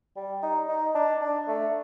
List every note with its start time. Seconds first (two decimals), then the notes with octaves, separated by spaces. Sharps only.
0.16 G3
0.42 D#4
0.68 D#4
0.95 D4
1.21 D4
1.47 A3